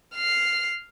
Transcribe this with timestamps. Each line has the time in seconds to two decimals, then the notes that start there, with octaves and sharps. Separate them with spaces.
0.15 F6 C7